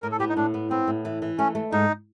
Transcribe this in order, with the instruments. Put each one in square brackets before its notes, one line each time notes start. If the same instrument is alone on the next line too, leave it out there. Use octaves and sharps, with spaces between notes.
[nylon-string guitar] A2 [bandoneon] A#4
[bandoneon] A4
[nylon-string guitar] B3 [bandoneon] G4
[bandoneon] D#4
[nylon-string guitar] A2 [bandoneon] D4
[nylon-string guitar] B3
[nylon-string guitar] B3 [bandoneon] C4
[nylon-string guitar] A2
E3
E3
[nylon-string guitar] A3 [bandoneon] C#4
[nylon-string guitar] A3
[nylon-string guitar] G#2 [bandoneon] D#4